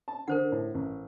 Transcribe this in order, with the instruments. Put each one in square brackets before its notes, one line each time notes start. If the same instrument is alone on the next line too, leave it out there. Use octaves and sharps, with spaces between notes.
[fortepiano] A5
[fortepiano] D3 [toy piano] A#4 C5 F#5
[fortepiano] A2
A1